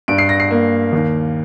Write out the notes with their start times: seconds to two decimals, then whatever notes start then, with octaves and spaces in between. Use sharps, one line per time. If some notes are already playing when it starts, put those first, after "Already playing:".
0.08 G2 D7
0.18 C7
0.29 A#6
0.40 C7
0.51 A#3
0.92 D#2